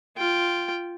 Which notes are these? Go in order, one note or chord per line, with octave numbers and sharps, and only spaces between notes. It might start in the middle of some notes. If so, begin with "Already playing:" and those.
F4 G5